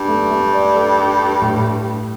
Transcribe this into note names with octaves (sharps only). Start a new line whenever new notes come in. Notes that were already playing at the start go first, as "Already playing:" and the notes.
Already playing: G2 D4 D5
A3
A3
D5
A4
A4
A4
A2